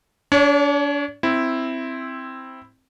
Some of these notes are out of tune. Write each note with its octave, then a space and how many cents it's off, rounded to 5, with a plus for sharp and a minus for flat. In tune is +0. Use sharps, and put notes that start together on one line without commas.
D4 -35 C#5 +20
C4 +0 E4 +0